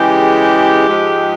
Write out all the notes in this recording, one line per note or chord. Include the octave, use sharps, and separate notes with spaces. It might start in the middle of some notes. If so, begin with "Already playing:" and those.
Already playing: C#3 E3 G#3 G4
G#2 F3 G#3